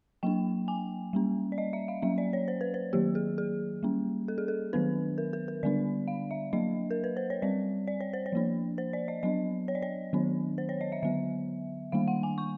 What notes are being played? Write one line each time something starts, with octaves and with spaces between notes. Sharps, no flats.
F#3 A#3 D4 G5
G#5
G3 A#3 C#4
D5
D#5
E5
F5
F#3 A#3 C#4 E5
D5
C#5
C5
B4
C5
D#3 F#3 A#3 G4
G#4
G#4
G3 A#3 C#4
A4
G#4
A4
D#3 F#3 B3 D4 B4
A#4
A#4
A#4
D3 G3 B3 D4 D5
F5
E5
F#3 A#3 D4 D#5
A#4
B4
C5
C#5
G3 C4 D5
D5
C#5
C5
C#5
F3 A#3 D4
C5
D5
D#5
F#3 B3 D4 D#5
C#5
D5
C#5
D#3 F#3 B3 D4
C5
C#5
D#5
E5
D3 F#3 B3 E5
D#3 G3 A#3 D4 F5
F#5
G#5
C#6